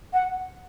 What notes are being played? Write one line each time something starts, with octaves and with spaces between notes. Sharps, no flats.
F#5